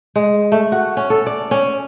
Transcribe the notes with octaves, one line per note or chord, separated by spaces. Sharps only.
G#3
A3
F#4
C#4
A4
D5
C#4